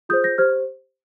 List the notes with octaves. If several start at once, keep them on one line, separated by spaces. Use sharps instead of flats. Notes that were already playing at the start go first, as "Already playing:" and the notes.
F4 G#4 C5 D#6 G6
G6 A#6
G4 C5 F6 G#6